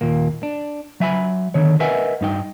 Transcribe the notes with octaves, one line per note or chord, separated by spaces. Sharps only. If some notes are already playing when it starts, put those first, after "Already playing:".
D#2 A#2 A#3
D4
F#3 E5 G#5 B5
D3 D#3 C#5
A#4 B4 D#5 E5 F#5 G#5
G2 D#4 G5